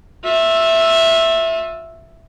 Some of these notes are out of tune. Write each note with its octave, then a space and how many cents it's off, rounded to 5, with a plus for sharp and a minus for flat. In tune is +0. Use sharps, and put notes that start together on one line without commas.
F4 +35 E5 +0